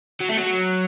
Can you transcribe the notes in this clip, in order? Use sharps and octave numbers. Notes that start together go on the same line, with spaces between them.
F#3
A3
F#3